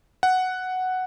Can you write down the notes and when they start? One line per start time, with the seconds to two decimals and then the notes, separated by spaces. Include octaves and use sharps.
0.23 F#5